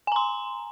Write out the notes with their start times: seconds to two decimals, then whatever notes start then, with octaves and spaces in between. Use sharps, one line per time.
0.07 G#5
0.12 A#5
0.16 C6